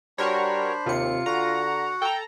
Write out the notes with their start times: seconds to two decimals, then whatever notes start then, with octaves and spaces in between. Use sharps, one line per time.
0.18 G3 D4 F#4 A#4 C5 C#5 B5
0.86 D#2 C3 F4 C#7
1.26 D3 F#4 F#5 A#5
2.02 A4 G5 A#5